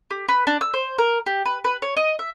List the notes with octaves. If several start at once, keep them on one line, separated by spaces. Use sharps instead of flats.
G4
B4
D4
E6
C5
A#4
G4
B4
B4
C#5
D#5
E5